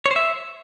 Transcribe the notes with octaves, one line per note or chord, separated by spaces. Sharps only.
C#5
C5
E5